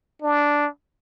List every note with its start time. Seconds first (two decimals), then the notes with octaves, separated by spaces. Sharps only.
0.22 D4